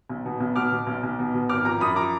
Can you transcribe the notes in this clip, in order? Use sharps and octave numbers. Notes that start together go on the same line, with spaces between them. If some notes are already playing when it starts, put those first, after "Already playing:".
B1
B2
B1
B2 D6 F6
B2
B1
B1
B2
B2
G#1 D6 F6
F3 A#5 D6
F#2 B5 D#6
F3 A#5 D6